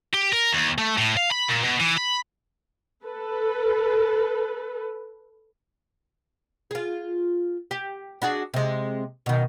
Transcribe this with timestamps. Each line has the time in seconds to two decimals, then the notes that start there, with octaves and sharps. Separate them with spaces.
0.14 G4
0.33 A#4
0.52 D#2
0.78 A3
0.98 A2
1.17 F5
1.31 B5
1.48 A#2
1.64 B2
1.80 E3
1.98 B5
3.04 A4 B4
6.71 F4 G#4
7.71 G4
8.22 D4 F#4 G#4
8.54 C3 G#3
9.26 B2 D#3